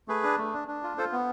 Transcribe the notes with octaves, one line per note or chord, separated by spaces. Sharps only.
A3 G#4 B4
D4
A3
D4
D4
F4
F4 A4 C5
B3